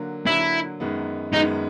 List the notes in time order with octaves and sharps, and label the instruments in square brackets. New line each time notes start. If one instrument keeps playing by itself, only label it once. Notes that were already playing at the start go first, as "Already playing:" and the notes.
Already playing: [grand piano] D3 F#3 A#3
[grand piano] D3 F#3 A#3 [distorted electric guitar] E4
[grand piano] F#2 D#3 G#3 B3
[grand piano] F#2 D#3 G#3 B3 [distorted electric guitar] D#4